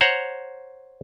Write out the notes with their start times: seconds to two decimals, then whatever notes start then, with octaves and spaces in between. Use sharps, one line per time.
0.01 C5 C#5 F#5 A#5